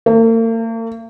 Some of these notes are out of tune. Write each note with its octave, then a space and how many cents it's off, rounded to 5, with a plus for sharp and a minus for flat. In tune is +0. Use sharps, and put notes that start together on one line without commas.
A#3 -45